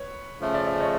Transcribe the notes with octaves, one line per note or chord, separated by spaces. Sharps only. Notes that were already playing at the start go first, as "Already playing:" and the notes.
Already playing: B4 C#5
C#3 F3 A3
D5 E5
D5 E5
C#5 D#5